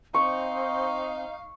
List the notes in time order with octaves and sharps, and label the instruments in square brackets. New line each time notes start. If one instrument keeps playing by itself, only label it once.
[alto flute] C4 [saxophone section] D#4 F5 [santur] C#6